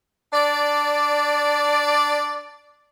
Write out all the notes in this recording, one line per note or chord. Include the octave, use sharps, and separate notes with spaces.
D4 D5